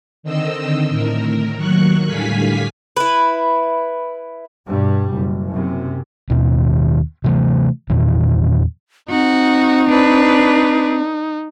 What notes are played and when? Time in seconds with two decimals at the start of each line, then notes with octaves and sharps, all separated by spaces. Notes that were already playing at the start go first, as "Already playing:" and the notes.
0.23 D3 D#3 C4 D#5 E6
0.89 A2 A#4
1.55 D#2 D#3 F#3 C#6 F#6
2.06 A2 D3 G3 F5 G#5 B6
2.96 E4 B4
4.67 G2 B2 G3
5.14 F#1
5.50 F#2 C3
6.29 D#2 B2 D#3
7.24 C3 E3 A3
7.89 E2 A#2 D#3 E3
9.09 C4 D#4 F#4
9.88 D4 B4